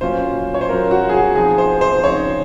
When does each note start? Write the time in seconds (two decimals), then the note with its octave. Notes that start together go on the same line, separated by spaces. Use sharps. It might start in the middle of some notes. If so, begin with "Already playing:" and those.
0.01 A#2 F#3 C#4 F4 C5
0.54 C#5
0.61 C5
0.68 F#3 C#4 F4 A#4
0.91 F#4
1.09 G#4
1.14 F#4
1.35 F3 C4 D#4 G#4
1.58 C5
1.81 C5
2.03 C#3 F3 C4 D#4 C#5